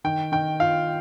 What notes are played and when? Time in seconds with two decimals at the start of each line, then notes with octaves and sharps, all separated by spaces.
0.04 D#3 G5
0.32 D#3 G5
0.60 F4 F5